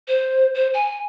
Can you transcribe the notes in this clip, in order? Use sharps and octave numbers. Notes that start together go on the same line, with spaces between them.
C5
C5
G#5